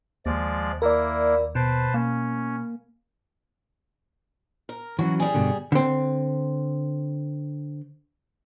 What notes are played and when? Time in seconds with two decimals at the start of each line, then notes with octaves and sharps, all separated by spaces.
0.26 D#2 F3 G#3 D5
0.82 A#3 E4 A#4 D5
1.55 B2 B4 C5 A5
1.94 A#3 C#4
4.69 A#4
4.99 E3 F#3 C#4 F#4
5.20 G3 G#4
5.34 G2 B2 D3
5.72 D3 C4